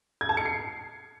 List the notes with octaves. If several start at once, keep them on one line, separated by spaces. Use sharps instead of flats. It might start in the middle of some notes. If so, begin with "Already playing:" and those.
G#6
A5
C#7
C7